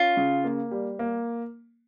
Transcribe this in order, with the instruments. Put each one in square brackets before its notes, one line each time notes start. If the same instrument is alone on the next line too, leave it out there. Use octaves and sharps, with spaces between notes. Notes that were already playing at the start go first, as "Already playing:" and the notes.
Already playing: [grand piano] C#4 [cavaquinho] F4
[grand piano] C#3
A#3
G3
A#3